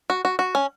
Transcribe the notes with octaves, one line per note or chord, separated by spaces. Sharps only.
F#4
F#4
F#4
C#4